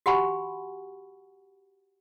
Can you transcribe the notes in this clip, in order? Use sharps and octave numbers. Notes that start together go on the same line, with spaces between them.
F#4 G4 F#5 G#5 B5 C#6